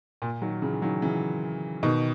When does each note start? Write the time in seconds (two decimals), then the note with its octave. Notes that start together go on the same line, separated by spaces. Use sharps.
0.22 A#2
0.42 D#3 F#3
0.62 C#3 E3
0.82 D#3 F#3
1.02 C#3 E3
1.83 B2 D#3